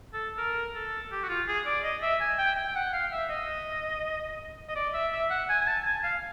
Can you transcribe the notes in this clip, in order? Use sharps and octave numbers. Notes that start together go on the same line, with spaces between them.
A4
A#4
A4
G4
F#4
F4
G#4
D5
D#5
E5
G#5
G5
G5
G5
F#5
F5
E5
D#5
D#5
D5
E5
E5
F#5
G#5
G#5
A5
G#5
F5